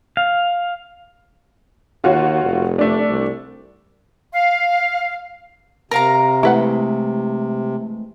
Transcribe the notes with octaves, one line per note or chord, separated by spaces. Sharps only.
F5
D#2 F4 F#4 C#5
F1
A3 D4
C2
F5
C3 A#4 F5 A#5
E3 G#3 A3 E4 B4 F#5